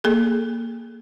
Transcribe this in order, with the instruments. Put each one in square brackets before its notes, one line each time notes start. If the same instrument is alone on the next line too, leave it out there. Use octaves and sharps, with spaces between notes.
[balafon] A#3 G#4 A4